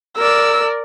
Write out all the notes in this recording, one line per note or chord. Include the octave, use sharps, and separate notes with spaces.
A#4 D5 E6